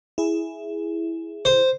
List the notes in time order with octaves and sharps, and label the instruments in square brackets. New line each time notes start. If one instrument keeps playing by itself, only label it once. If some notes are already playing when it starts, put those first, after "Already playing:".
[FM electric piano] E4 G#4
[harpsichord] C5